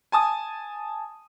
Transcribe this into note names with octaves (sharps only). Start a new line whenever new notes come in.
G#5 A5 D#6